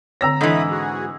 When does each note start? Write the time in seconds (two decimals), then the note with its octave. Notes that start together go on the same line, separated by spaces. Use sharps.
0.21 D3 C4 C#5 A#5 E6 A#6
0.41 G#2 E3 D4 A4 D#5 E5 B5 D#6
0.71 F#4 G#4